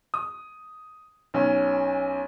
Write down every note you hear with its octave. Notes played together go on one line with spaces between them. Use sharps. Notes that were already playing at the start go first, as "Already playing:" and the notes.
D#6
B1 C#4